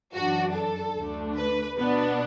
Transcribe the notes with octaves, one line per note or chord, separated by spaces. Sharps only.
F#2 E3 D4 F#4
A4
D2 D3 A3 D4
B4
B2 B3 D4 B4